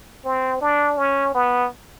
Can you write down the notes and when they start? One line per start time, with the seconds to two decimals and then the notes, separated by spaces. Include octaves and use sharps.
0.25 C4
0.61 D4
0.98 C#4
1.35 B3